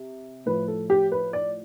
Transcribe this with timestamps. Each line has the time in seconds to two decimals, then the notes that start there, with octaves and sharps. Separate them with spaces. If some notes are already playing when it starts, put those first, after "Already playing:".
Already playing: C3
0.46 A2 F3 B4
0.68 A4
0.90 G4
1.12 B4
1.33 D5